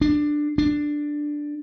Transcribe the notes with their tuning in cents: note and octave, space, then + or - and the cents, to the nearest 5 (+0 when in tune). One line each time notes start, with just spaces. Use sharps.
D4 +10
D4 +5